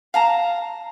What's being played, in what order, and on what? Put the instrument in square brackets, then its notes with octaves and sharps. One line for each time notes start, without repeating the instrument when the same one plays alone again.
[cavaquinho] F5 A5 A#5